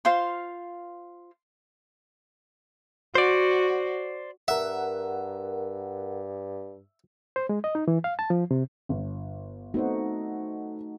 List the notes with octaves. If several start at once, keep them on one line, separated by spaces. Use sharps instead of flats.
F4 C5 F5 C6
F#4 C5 D5
G2 A#4 E5 F#5
C5
G#3
D#5
D#4
E3
F5
A5
F3
C3
G1
A3 B3 C4 D#4 F#4 C5